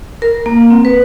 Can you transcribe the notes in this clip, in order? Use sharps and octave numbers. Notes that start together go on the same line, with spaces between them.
A#4
A#3
C4
B4